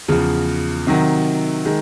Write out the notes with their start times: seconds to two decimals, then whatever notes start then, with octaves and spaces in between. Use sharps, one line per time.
0.08 E2 C#3 F3
0.87 C3 D#3 F#3
1.65 D#3 G#3